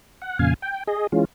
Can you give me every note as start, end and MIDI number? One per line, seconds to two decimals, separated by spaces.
0.22 0.38 78
0.39 0.54 41
0.39 0.54 46
0.39 0.54 49
0.39 0.54 77
0.39 0.54 80
0.62 0.83 79
0.87 1.07 68
0.87 1.07 75
1.12 1.25 52
1.12 1.25 56
1.12 1.25 61
1.12 1.25 65